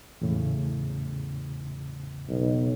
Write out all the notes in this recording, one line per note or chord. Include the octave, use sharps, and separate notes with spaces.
E2 A2 C#3
B1